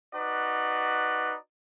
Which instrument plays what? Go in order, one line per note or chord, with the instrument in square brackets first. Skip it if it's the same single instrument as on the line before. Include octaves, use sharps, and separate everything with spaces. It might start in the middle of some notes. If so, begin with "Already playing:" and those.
[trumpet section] D#4 F#4 B4 D5